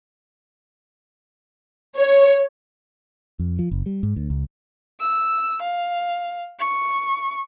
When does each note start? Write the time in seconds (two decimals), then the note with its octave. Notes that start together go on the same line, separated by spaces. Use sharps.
1.97 C#5
3.39 F2
3.59 F3
3.71 F#1
3.86 G3
4.03 G#2
4.16 D2
4.30 C#2
5.00 E6
5.62 F5
6.59 C#6